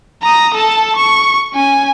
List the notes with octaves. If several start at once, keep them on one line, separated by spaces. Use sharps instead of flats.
A#5 D#6
A4 A5
C#6
C#4 G#5